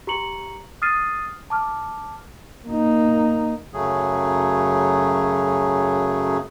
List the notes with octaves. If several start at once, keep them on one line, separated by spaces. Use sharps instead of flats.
G4 A#5 C#6 C#7 F#7
D#6 F6 A6 C7 D#7
A5 D6 F6
A#3 D#4
F#2 C#3 F#3 A3 G#4